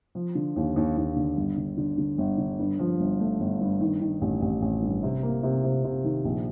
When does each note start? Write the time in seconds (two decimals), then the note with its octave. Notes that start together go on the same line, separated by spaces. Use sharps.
0.15 F3
0.35 D3
0.56 D#2
0.76 D#2
0.97 D#2
1.16 D3
1.37 G1
1.58 D3
1.77 D3
1.98 D3
2.18 G1
2.38 D3
2.59 G2
2.79 F3
3.00 G1
3.20 A3
3.40 G1
3.61 G2
3.81 D#3
4.01 D#3
4.21 A1
4.42 A1
4.62 A1
4.82 G2
5.03 C3
5.23 A#3
5.43 C3
5.64 C3
5.84 C3
6.04 D#3
6.25 A#1